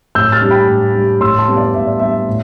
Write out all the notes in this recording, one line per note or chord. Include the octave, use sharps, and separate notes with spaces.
A2 E6 G6
F6 A6
G3 D4
G5 B5
A2
G3 D4
A2 C6 E6
A5 C6
G3 B3 D4
D5 F5
A2 E5
D5
G3 B3 D4 E5
A2